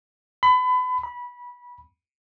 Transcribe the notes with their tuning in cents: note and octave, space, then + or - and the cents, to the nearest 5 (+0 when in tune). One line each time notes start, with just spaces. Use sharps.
B5 +30
B5 -20